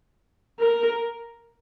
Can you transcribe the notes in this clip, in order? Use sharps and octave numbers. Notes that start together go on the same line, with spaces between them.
A#4